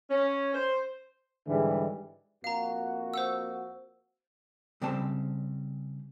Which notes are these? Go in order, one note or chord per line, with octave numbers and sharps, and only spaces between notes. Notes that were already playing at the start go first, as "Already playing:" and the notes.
C#4
C5
G#2 D3 E3 G3 G#3
F2 A#3 F#4 F5 A#5
C5 F#5 E6
C#3 G3 C4 C5 G5 A5